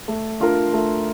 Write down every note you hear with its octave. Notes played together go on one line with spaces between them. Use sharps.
A3
D4 F4 A#4
A3